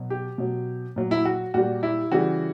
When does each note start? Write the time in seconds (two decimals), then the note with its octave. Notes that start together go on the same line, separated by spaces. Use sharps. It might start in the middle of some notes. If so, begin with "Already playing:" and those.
Already playing: B2 F#3
0.10 G4
0.38 B2 F#3
0.96 A#2 F#3
1.11 E4
1.25 F#4
1.54 A#2 G3 F#4
1.83 E4
2.12 C#3 E3 G3 F#4